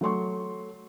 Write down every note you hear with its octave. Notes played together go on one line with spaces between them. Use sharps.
F#3 A3 C6 C#6